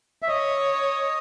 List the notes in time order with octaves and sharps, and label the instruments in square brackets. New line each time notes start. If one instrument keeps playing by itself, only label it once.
[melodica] E5
[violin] C#5 [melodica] D#5